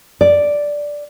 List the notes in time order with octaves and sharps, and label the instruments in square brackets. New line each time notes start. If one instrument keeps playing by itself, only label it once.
[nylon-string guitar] D5